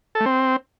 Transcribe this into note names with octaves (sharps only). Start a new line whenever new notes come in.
A4
A3
C4